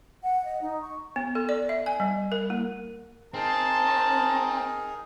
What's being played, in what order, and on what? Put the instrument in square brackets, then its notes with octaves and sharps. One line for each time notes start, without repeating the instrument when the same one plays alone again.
[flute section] F#5
D#5
D#4
C#6
[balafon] B3
A4
D5
E5
G#5
G3
A#4
A#3
[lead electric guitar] C4 [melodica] D#4 G#4 A#4 [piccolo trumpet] A5